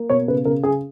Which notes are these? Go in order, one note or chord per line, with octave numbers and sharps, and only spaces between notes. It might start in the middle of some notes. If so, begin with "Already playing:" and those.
Already playing: A#3
B2 C#5
C#3 B4
C#3 A#4
C#3 G#4